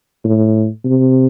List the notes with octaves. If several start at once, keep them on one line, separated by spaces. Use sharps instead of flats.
A2
C3